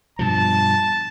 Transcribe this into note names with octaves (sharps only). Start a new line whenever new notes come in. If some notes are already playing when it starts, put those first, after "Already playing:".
G2 B2 F3 A5